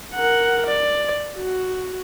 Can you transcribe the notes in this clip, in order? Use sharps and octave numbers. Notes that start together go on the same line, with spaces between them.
A#4 F#5
D5
F#4